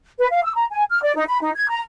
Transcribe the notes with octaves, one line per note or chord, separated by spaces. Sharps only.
B4
F5
E6
A#5
G#5
F6
D5
D#4
B5
D#4
G#6
A#5